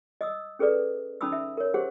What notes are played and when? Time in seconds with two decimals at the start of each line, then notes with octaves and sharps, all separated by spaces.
0.21 D#5 D#6 E6
0.59 C#4 G#4 A4 B4 D5
1.21 C#4 D#4 A5 B5 D#6 E6
1.32 E5
1.57 A#4 C#5
1.74 G4 G#4 C5 F#5